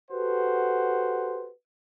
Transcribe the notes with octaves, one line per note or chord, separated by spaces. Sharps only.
F#4 G4 A4 B4 C5 F#5